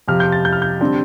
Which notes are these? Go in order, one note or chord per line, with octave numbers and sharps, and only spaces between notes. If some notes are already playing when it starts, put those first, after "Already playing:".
F2 C3 F3 F6
G6
A6
G6
F6
G6
D3 G3 C4